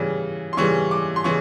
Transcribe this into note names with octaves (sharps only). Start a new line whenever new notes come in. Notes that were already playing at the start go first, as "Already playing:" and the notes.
Already playing: C#3 E3 G3
C6
C#3 E3 G3 C#6
D6
C6
C#3 E3 C#6